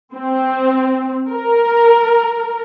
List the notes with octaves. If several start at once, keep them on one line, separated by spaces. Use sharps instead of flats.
C4
A#4